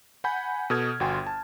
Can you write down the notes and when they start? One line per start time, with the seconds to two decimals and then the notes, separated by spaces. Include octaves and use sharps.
0.24 F#5 G#5 B5 G6
0.70 B2 A4 D#6 F6 G#6
1.00 G1 F#4 G5 G#5 C6
1.27 A5